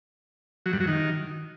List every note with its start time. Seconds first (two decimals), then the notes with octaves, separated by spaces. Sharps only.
0.66 F#3
0.73 G2
0.80 F#3
0.87 D#3